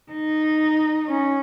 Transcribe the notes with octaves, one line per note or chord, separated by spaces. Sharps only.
D#4
C#4